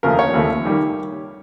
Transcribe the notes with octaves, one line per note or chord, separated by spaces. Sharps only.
D#2 C#3 F3 A3 A#4
C#5
D#2 C#3 F3 A3
D#3 G3 A#3